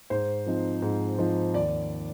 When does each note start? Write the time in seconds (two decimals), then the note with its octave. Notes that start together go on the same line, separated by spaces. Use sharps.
0.10 G#2 C5
0.46 F3 C4 D#4
0.82 G#2
1.18 F3 C4 D#4
1.54 D#2 D5